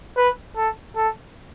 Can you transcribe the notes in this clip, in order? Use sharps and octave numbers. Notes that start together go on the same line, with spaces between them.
B4
A4
A4